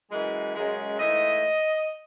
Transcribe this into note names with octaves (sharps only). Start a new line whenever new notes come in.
F#2 E3 G#3
F#2 C#3 G#3
G#2 E3 A3 D#5